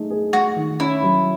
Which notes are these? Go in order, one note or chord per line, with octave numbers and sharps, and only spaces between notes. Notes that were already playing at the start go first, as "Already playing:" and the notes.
Already playing: A3 D#4 G#4
G#4
A3 F#4
D#3
C#4 E4
F#3